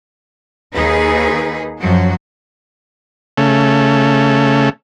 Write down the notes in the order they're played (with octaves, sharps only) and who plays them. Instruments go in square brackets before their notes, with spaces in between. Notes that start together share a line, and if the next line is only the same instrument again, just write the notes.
[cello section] D#2 D#4 G#4 B4
F#2 F3 F#3 F#4
[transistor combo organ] C#3 A3